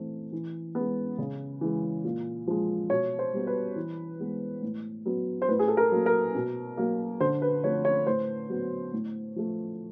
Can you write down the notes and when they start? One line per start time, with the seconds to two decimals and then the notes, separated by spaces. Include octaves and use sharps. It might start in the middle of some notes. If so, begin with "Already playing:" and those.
Already playing: E3 A3 C4
0.32 E3
0.75 G#3 B3
1.18 C#3
1.61 E3 G#3
2.04 A#2
2.47 F3 G#3
2.90 B2 C#5
3.19 C5
3.33 G3 B3
3.47 B4
3.76 E3
4.20 G#3 B3
4.62 A2
5.06 F#3 B3
5.42 C5
5.49 A2 B4
5.59 G#4
5.68 A4
5.77 A#4
5.92 F#3 A#3
6.06 A#4
6.35 B2
6.77 F#3 A#3
7.20 D3 C5
7.42 B4
7.64 F3 A3 C4 C#5
7.85 C#5
8.07 A2 C5
8.50 F#3 B3
8.92 A2
9.36 F3 A3